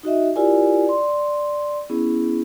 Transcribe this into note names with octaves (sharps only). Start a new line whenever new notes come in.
D#4 F#4 D#5 E5
E4 F4 G4 A#4 D5 G#5
D5 C6
B3 C#4 E4 G#4